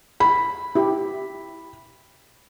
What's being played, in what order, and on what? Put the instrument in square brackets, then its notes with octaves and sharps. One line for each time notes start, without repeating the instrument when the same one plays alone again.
[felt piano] B5
[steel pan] E4 G4